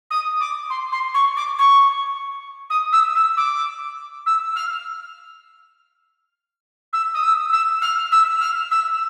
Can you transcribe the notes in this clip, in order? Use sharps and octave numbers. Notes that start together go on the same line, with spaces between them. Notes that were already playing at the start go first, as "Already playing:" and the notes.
D#6
D6
C6
C6
C#6
D6
C#6
D#6
E6
E6
D6
E6
F6
E6
D#6
E6
E6
F6
E6
F6
E6